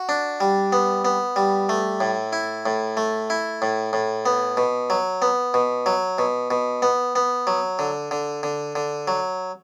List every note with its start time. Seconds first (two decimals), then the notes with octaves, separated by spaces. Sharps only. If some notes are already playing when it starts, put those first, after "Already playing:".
Already playing: F#4
0.09 D4
0.40 G3
0.72 B3
1.05 B3
1.36 G3
1.69 A3
2.01 A2
2.33 E4
2.66 A2
2.97 A3
3.30 E4
3.62 A2
3.93 A2
4.26 B3
4.57 B2
4.90 F#3
5.22 B3
5.54 B2
5.86 F#3
6.18 B2
6.51 B2
6.82 B3
7.16 B3
7.47 F#3
7.79 D3
8.11 D3
8.43 D3
8.75 D3
9.08 F#3